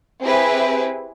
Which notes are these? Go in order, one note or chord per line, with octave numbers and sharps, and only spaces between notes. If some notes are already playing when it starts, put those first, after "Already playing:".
C4 E4 G4 G#4 B4 E5